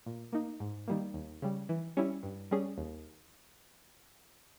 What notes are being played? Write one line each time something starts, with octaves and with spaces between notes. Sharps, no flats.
A#2
A#3 D#4
G#2
D#3 G3 A#3
D#2
C#3 G3
E3
G3 C#4 E4
G2
G3 C#4 G#4
D#2